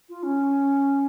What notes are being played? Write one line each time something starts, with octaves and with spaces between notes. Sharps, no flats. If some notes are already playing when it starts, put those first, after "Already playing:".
F4
C#4